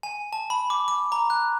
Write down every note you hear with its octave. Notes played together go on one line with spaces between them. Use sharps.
G#5
A5
B5
D6
D6
A#5
F#6